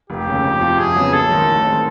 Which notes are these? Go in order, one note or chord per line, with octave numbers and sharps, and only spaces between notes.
F1 G4
D#2 C#3
F2
C3 F3
F2 G#4
C#3 F#3 B3
A#1 A4
G#2 D#3 F#3
A1
D#3 G#3 C4